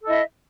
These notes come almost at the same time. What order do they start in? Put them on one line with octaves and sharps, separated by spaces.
A4 D#5 E4 E5